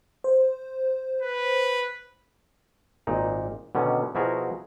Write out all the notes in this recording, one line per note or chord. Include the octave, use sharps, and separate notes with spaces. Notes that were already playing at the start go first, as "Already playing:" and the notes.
C5
B4
G#1 A#2 D#4
B2 D3 D#3 C#4
B2 F3 E4 F#4 G#4 A#4